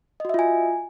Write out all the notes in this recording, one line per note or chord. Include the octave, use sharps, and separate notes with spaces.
F4 F#4 D#5 E5 G#5